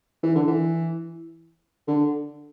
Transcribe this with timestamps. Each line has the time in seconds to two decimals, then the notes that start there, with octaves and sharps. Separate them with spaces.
0.23 E3
0.35 D3
0.47 E3
1.87 D3